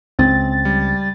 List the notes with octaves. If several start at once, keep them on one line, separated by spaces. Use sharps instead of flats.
C#2 C4 A6
G3